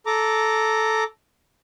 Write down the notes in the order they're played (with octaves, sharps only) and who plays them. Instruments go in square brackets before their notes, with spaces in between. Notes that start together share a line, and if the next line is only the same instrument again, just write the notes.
[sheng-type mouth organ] A4 A#5 D6